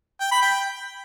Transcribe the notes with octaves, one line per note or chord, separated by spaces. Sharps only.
G5
B5
G5